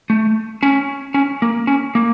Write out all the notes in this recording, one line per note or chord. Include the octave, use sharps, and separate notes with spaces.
A3
C#4
C#4
A#3
C#4
A#3